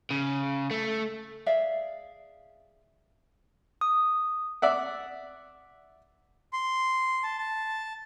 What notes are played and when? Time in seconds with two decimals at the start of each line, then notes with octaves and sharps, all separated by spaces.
0.11 C#3
0.71 A3
1.46 G#4 D5 E5 F5
3.81 D#6
4.62 D5 E5 F#5
6.53 C6
7.23 A5
7.38 A5